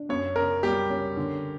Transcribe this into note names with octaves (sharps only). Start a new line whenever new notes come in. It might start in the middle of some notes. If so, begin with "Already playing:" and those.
Already playing: D4
F#2 C#5
C#3 A#4
G3 G4
C#4
D3